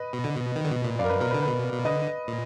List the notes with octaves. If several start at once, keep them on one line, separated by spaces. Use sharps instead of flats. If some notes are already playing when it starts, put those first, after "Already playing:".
Already playing: B4 D#5
B2
D3
B2
D#3
D3
B2
A#2
F#2 D5 F5
A#4
B4
B2 A#4
B4
D3
B4
B2
B2
D3 B4 D#5
A#2